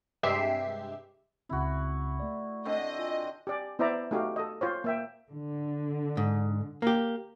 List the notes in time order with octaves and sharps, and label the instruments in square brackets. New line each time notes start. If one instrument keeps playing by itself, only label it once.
[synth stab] G2 C3 G#3 G4 E5 C7
[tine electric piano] C#2 C#3 C4 [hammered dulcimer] E4 F#4
[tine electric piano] A3 D5
[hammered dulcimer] D3 C4 [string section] D#5
[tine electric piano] F4 G#5
[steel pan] G4 D5 G#5
B3 E4 C5 D5 E5 A#5
A3 D#4 F#4 G4 F5
A4 D#5
F4 C5 C#5
A#3 E5 G5
[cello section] D3
[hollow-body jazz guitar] G#2
A#3 G4